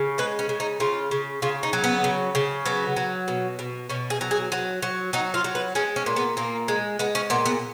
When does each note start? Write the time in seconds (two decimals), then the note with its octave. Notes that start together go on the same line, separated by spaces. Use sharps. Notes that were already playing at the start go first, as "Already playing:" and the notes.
Already playing: C#3
0.18 G#3 B4
0.39 C#4
0.49 C#3
0.60 D#4
0.80 C#3 F4
1.11 C#3
1.42 C#3 F4
1.63 D#4
1.73 F#3
1.84 B3
2.04 C#3
2.35 C#3
2.65 F#3 B3
2.96 F#3
3.28 B2
3.59 B2
3.89 B2 C#4
4.10 G#4
4.21 F#3
4.31 G#4
4.52 F#3
4.82 F#3
5.13 F#3 D#4
5.34 F4
5.44 F#3
5.55 B4
5.75 G#3 C#4
5.96 C#4
6.06 A#2
6.16 B3
6.37 A#2 A#3
6.68 G#3
6.99 G#3 B3
7.15 C#4
7.30 A#2 B3
7.46 B3